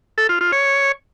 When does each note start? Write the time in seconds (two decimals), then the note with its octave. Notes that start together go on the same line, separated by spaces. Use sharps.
0.18 A4
0.29 F4
0.41 F4
0.52 C#5